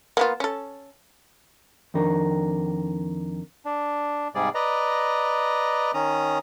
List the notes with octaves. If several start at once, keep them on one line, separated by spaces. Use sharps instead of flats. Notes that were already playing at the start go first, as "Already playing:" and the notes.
A#3 B3 F4
C#4 A4
F2 D#3 D4 A#4
D4
G#2 C3 G3 G#4 D5
B4 D5 D#5 A#5
D#3 C#4 A#5 D#6